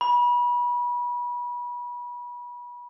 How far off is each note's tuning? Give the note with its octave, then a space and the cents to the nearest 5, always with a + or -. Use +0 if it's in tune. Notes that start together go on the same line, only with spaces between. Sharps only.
B5 -30